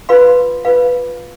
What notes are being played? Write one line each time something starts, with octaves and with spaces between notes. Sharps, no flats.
F4 B4 F5 C6
F4 B4 F5